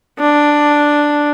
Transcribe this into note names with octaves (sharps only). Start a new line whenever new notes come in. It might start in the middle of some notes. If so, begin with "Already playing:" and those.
D4